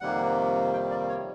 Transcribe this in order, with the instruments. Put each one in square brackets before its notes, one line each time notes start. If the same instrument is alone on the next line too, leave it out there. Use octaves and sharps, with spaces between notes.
[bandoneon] F2 C3 D#3 G3 A#3 F#5
G5
D5
C#5